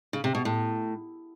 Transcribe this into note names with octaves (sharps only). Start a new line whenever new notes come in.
C#3
C3
B2
A2